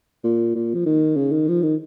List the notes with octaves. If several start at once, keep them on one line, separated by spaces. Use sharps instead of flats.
A#2
A#2
F3
D#3
C#3
D#3
F3
D#3